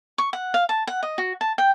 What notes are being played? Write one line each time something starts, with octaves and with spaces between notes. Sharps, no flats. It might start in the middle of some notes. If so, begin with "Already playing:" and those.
C#6
F#5
F5
A5
F#5
D#5
F#4
A5
G5